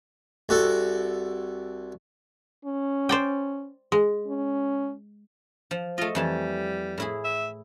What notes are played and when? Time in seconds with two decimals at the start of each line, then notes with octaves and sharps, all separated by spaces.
0.49 C2 F#4 A4
2.65 C#4
3.09 C5 D5 G5
3.92 G#3
4.27 C#4
5.71 F3
5.98 A3 F4 D#5
6.15 F2 E3 G3 A5
6.98 A2 E4 G#4
7.24 E5